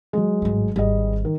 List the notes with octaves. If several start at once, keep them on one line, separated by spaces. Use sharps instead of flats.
F#3 G#3
G#1 A2
G#1 G3 G#4 D#5
D#3